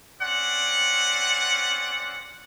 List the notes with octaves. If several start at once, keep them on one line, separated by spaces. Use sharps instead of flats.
C4 C#4 D5 F#5